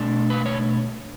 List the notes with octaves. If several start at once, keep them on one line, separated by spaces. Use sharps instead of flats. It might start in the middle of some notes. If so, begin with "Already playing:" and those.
Already playing: B2 A3 D4
B4
C#5